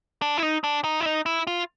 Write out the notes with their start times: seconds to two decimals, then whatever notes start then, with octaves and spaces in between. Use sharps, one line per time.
0.22 D4
0.37 E4
0.43 D#4
0.64 D4
0.84 D#4
1.00 E4
1.06 D#4
1.26 E4
1.47 F4